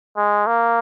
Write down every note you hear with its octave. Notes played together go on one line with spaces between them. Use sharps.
G#3
A#3